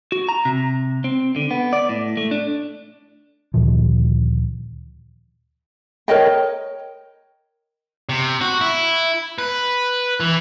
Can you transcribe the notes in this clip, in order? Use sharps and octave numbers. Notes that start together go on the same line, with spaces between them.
F#4
A#5
C3
C4
D3
B3
D5
A2
A3
D4
D2 A#2 D#3 F3
A#4 C#5 D#5 G5
C3
F#4
E4
B4
E3